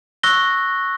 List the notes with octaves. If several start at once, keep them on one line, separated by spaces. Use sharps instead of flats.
C#6 E6 F#6 A#6 G7